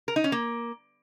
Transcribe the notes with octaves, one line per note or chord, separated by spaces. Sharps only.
A#4
D#4
C#4
A#3